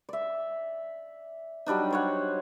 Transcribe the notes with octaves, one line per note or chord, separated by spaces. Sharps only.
D5 E5
F#3 G3 D4 D#4
C5 C#5 F#5